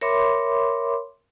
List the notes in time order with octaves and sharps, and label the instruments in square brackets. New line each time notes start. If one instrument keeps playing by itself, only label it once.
[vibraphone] A#4 C#5 E5 B5 C6 D6